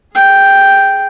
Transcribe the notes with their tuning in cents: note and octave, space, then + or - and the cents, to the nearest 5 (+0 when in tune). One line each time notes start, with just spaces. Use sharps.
G#4 +0 G5 +0